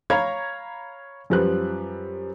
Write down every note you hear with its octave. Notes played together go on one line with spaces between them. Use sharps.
C#5 F5 A#5 B5 G#6
F#2 F3 G3 B4 F#6